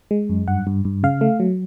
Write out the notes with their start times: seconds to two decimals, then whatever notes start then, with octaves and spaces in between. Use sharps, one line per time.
0.11 G#3
0.29 F#2
0.48 G2 F#5
0.67 G2
0.85 G2
1.03 C#3 F5
1.21 A3
1.40 F#3